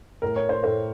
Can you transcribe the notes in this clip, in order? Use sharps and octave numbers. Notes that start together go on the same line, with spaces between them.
A2 A3 A#4
C#5
C5
A2 A3 C5